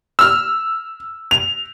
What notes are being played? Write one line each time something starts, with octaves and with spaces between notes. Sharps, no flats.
E6 F6
F7